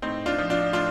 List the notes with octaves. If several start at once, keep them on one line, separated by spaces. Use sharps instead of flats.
A2 C4 D#4
D4 F4
F3
D4 F4
A2 D4 F4